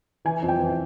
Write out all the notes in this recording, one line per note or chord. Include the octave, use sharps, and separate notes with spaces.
E3 G#5
F2
G5
E3